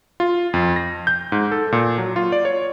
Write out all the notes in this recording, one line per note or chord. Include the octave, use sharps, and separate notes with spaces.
F4
F2
A#6
G6
G#2
A4
A#2
F#3
F4
D5
C#5